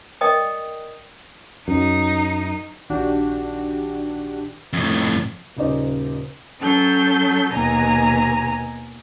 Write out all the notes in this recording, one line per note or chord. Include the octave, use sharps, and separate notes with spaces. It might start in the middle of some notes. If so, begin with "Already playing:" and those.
A#4 D5 D#5 G5 D#6
F#2 D#4
A#1 D#3 D4 F#4 G4
F2 A2
D#1 C#3 D#4 C5 D5
F#3 C#4 A4 G6
D#2 B2 G#5 A#5